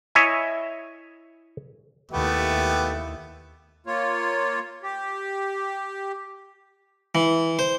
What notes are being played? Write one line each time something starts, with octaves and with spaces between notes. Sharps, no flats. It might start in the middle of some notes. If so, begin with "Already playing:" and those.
E4 C#5 D#5 E5 G#5
D#2 A3 B3 E4 G4
A#3 F4 C#5
G4
E3
C5